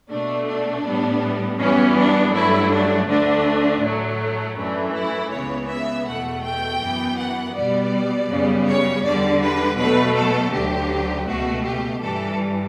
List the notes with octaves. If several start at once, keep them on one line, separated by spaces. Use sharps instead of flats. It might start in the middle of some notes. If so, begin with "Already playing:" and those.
B2 A3 D4
D4
A2 G3 B3
F#2 E3 G3 B3 C#4
D4
G2 F#3 A3 E4
D4
D2 D3 A3 D4
A2 F#3 A3
F#2 E3 A3 D4
E4
C#2 C#3 E3 B3 C#5
E5
E2 B2 A3 F#5
G5
F#2 E3 B3
F#5
B2 G3 B3 D5
F#2 C#3 G3 B3
C#5
E2 D3 G3 D5
B4
B2 F#3 A3 B4
A4
D2 D3 F#3 G4
C#2 B2 A3 F#4
G4
G2 E3 G3 A4